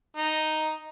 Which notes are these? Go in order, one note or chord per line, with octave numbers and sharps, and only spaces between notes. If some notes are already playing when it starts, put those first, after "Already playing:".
D#4